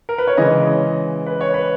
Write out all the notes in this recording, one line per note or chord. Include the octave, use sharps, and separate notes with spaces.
A#4
B4
C#5
C#3 E3 G#3 D#5
B4
C#5
B4